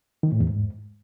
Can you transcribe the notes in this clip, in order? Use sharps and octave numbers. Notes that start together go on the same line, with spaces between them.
D#3
A2
E2
G#2